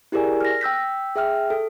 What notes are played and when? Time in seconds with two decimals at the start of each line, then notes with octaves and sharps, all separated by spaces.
0.12 E4 G4 G#4 A#4 D5 G#5
0.41 F6 A#6
0.61 G5 E6 G6 B6
1.16 G#4 E5 G5 F6
1.50 A4